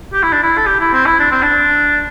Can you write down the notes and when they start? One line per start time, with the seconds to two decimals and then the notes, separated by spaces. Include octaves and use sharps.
0.13 G4
0.23 E4
0.33 D4
0.43 E4
0.57 A4
0.66 G4
0.80 E4
0.93 C4
1.06 E4
1.19 D4
1.32 C4
1.43 D4